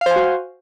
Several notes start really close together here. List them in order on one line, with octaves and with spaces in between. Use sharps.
F5 C5 G#5 F#4